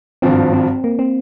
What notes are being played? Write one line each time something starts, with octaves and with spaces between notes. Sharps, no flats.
G#1 G2 F3 C4
C4
A#3
C4